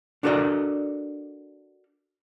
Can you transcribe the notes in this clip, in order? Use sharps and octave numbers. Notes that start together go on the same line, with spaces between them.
D4 F#4 A4 A#4 D5 D#5